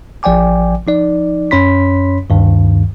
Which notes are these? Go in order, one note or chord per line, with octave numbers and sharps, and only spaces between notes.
A1 F3 D5 G5 G#5 D6
F3 D#4 D5
F#2 C#4 C#5 B5 C6 B6
D2 G2 D#3